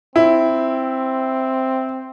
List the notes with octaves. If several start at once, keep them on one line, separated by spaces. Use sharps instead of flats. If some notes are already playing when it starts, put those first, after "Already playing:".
C4 E4